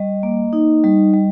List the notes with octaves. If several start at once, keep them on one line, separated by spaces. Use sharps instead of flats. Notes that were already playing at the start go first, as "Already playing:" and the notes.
Already playing: G3 D#5
A#3
D#4
G3
G3